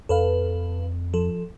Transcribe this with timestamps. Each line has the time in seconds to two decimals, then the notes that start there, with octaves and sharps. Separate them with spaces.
0.09 F2 A4 B4 F5
1.14 F3 A4